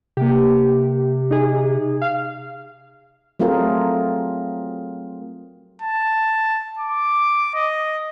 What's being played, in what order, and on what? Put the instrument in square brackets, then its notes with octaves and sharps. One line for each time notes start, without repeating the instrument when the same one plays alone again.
[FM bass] C3 [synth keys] A#3 G4
[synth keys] D#4 G#4
F5
[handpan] F#3 A3 C4 F4 G#4 A#4
[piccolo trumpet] A5
D6
D#5